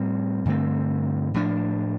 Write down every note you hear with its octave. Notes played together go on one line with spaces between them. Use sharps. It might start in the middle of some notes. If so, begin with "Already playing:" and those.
Already playing: A2 G3 C4
G2 D3 A3 C4
A2 F3 D4